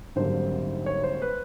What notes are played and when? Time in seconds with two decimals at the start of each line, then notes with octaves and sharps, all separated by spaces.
0.16 G#1 F#2 D3 G3 A#3 C5
0.86 C#5
1.04 C5
1.22 B4